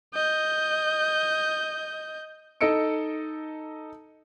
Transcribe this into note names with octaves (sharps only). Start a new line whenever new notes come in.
D#5 G6
D#4 A4 D#5 E6 C#7 D7